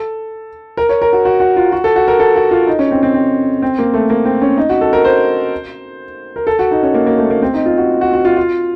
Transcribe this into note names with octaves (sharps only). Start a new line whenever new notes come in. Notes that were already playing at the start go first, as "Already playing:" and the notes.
Already playing: A4
A#4
C#5
A#4
F#4
F#4
F#4
F4
F#4
A4
F#4
A#4
A4
F#4
F4
D#4
C#4
C4
C4
C4
C4
A#3
A3
A#3
C4
C#4
D#4
F#4
A4
A#4
C5
A#4
A4
F#4
D#4
C#4
A#3
A#3
A3
A#3
C4
D#4
F4
F#4
F#4
F#4
F4
F4